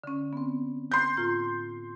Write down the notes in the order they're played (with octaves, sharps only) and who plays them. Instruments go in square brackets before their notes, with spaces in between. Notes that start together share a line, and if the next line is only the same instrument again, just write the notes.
[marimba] D3 C#4
B3 C4
[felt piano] C6 G6
[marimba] A2 F4 A#5